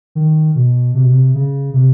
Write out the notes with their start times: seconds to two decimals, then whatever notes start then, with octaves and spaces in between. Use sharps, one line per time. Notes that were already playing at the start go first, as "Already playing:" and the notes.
0.15 D#3
0.55 B2
0.94 C3
1.03 B2
1.09 C3
1.34 C#3
1.74 C3